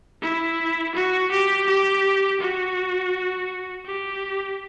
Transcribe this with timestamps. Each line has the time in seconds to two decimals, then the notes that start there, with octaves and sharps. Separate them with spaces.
0.22 E4
0.94 F#4
1.31 G4
1.67 G4
2.40 F#4
3.85 G4